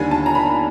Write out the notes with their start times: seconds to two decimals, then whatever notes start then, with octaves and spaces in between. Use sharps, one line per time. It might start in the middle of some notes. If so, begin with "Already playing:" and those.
Already playing: D#2 D3 G3 G#5
0.11 A5
0.26 A#5
0.35 B5